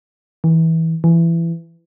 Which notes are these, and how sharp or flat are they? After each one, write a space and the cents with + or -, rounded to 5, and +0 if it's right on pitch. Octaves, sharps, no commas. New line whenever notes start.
E3 -25
E3 +20